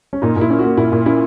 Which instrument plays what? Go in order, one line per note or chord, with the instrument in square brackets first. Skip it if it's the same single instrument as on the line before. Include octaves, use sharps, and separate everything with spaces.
[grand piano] C#4
[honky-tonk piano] A#2 [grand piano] D#4
[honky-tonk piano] A#2
[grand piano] E4
[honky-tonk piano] C#4
[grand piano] F#4
[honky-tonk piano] A#3
[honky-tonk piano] A#2 [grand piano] E4
[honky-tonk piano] A#2
[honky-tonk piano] C#4 [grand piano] E4